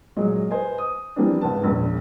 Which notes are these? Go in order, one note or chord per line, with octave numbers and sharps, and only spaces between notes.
A#2 F#3 G#3 D#5
B4 C5 D#5 G#5
D#6
E3 F3 G3 A#3 C4 D4
G#1 C#2 B4 A5
E1 A#1 A#2